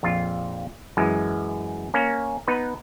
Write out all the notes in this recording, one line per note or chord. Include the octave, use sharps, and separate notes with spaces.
A#1 F2 F4
F#2 E3 G#3
A#3 C#4
B3 D#4 B4